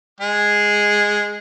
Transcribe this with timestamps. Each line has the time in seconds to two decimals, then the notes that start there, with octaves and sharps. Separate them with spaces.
0.21 G#3 G#4